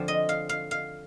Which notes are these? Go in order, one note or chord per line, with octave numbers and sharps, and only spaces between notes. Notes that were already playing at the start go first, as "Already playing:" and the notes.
Already playing: D3 F3 C4
D#5
F5
F5
F5